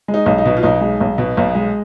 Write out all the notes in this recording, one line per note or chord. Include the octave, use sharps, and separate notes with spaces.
G#3
D#4
B1
D#4
B2
F4
B1 D#4
G#3
B1
B2
B1
G#3